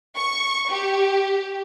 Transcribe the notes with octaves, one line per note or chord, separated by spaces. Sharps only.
C#6
G4